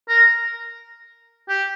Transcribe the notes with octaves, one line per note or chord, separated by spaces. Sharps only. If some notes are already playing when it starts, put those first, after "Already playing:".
A#4
G4